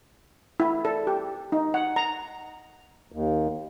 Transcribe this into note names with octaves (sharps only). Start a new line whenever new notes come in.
E4
A4
G4
D#4
F#5
A#5
D#2